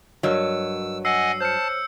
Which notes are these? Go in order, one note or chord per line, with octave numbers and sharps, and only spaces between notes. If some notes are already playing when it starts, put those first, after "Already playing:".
G2 F#3 A#4 C#5 D#5 E6
D#5 F#5 G#5 E6 C7
C5 C#5 A5 F6 G6 C#7